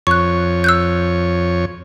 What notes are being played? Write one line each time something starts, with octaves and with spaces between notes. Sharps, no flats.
F2 C#5 C#6 F#6
E6 F#6 G6